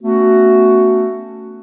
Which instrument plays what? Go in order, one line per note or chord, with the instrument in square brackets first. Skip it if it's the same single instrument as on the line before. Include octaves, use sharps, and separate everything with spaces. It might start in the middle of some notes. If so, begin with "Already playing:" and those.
[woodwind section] A3 B3 C#4 F#4